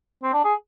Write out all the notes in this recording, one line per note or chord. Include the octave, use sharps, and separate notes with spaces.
C4
D4
G#4